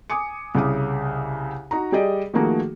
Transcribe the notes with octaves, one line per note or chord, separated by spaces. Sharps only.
G#5 D6 D#6 C#7
C2 C#3 D6 D#6
D#4 F#4 A#5
G3 G4 G#4 D5 D#5
D#3 F3 A3 A#3 F#4 G#4